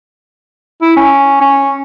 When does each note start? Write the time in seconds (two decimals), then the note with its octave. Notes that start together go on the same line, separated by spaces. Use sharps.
0.82 E4
0.97 C#4
1.41 C#4